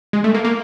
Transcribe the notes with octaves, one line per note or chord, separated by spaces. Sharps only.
G#3
A3
A#3
A#3